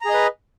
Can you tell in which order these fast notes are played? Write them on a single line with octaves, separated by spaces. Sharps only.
A#5 G#4 D#5 B4